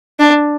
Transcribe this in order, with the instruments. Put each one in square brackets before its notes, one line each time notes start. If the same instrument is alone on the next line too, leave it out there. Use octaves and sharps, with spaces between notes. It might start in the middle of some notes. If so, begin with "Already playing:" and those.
[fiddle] D4